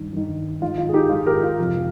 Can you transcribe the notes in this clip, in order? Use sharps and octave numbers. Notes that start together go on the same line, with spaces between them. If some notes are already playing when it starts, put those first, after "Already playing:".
Already playing: G2 D#3
G2 D#3
G#2 D#3 F4
F4
G#4
D#4 G4
G#2 D#3 F4 G#4
G4 A#4
F4
F2 C3 F3